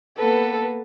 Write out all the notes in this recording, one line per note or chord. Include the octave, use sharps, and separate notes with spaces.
A#3 B3 A4 B4